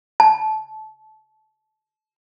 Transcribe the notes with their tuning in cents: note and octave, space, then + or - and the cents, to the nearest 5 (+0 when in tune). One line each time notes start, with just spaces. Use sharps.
A5 -25